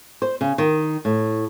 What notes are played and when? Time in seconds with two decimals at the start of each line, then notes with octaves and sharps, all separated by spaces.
0.22 C5
0.41 C#3
0.58 D#3
1.05 A2